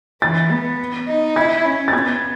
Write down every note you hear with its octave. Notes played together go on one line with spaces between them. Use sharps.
E3 A6
B3
D#4
E4 G#6
C#4
A6
B3 G#6